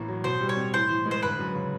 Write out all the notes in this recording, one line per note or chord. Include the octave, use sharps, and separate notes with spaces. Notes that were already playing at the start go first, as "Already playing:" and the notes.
Already playing: A1 A2 A#3
F#3
B2 C5
G3
C#5
C4
A2 C5
E3
G#3
C5
G1 B4
F#2
C#3